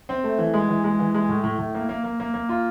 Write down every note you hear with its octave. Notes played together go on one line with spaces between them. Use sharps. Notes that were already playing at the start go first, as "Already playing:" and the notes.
C4
A3
E3
G#3
E3
G#3
E3
G#3
A2
A2
A2
A#3
A#3
A#3
A#3
A#3
F4